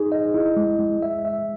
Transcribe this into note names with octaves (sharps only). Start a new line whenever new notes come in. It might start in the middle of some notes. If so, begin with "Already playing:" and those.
Already playing: D#4 G#4
D#5
E4
G#3
G#3
E5
E5